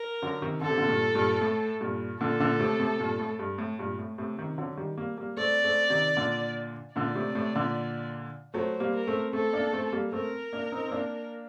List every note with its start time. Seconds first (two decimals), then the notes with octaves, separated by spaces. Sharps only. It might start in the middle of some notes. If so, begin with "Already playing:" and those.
Already playing: A#4
0.22 D3 F#3
0.42 C3 D#3
0.61 D3 A4
0.70 C3
0.77 A#2 D3
0.88 G2 A#2
1.15 G2 A#2
1.41 A2
1.81 G2 A#2
2.20 A#2 D3 A4
2.40 A#2 D3
2.60 A2 C3
2.79 A2 C3
3.00 G2 A#2
3.19 A2
3.39 G2
3.58 A2
3.79 G2 A#2
3.99 A2
4.18 A2 C3
4.38 C3 D#3
4.58 D3 F#3
4.77 D#3 G3
4.97 G3 A#3
5.18 G3 A#3
5.37 A3 C4 D5
5.64 A3 C4
5.90 C3 D#3
6.17 A#2 D3
6.95 A#2 D3 D5
7.15 A2 C3
7.35 A2 C3
7.55 A#2 D3
8.54 F#3 A3 C5
8.80 G3 A#3
8.94 A#4
9.07 A3 C4
9.33 A3 C4 A4
9.53 A#3 D4
9.73 A3 C4
9.93 G3 A#3
10.13 A3 C4 A#4
10.53 A#3 D4
10.72 C4 D#4
10.87 C4
10.91 A#3 D4